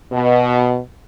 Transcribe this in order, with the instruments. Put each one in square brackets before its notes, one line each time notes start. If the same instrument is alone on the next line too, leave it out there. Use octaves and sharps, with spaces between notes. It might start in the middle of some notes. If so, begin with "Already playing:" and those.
[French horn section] B2